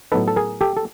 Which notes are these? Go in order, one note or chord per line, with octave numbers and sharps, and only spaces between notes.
A2 F#3 B3 D#4 A4 B4
A4
G#4 A#4
G4 A4
A4